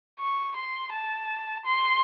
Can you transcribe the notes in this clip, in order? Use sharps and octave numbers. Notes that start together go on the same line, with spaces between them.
C#6
C6
A5
C6